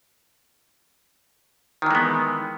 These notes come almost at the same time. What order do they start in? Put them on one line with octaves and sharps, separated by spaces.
D#3 E3 G#3 B3